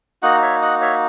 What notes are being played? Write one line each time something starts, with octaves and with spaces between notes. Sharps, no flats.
A#3 D#4 F#4 D#5 F#5
C#5 E5
D#5 F#5
C#5 E5